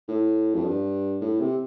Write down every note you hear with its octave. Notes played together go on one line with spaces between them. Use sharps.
A2
F2
G2
A2
C3